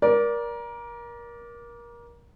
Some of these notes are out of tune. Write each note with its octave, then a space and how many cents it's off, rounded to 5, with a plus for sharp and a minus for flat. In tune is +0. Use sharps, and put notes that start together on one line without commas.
A#4 +25 D5 -10